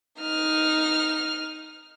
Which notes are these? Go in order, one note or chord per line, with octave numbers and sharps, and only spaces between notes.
D#4 F6